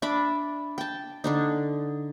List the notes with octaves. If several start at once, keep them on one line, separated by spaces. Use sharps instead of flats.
D4 E5 B5 D6
G5 A5
D3 D4 D#4